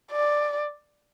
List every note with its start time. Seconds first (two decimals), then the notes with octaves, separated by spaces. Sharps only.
0.12 D5